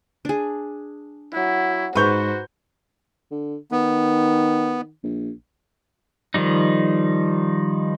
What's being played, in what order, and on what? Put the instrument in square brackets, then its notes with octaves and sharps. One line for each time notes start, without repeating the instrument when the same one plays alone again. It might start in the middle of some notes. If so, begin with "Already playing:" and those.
[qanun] D4 G#4
[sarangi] F#3 [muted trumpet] E4
[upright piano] G#2 C#6 G6 [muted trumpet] F#4 [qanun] B4 A#5 [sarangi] C5
[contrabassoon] D3
[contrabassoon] D#3 [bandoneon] B3
[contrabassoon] A#1
[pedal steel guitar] D#3 F3 G3 D#4